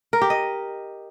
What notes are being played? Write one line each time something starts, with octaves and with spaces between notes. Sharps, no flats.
A#4
G4
D#5